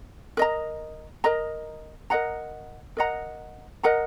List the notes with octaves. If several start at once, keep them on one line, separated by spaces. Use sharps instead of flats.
A#4 D#5 A#5
A#4 D#5 A#5
A#4 D#5 F#5 A#5
A#4 D#5 F#5 A#5
A#4 D#5 F#5 A#5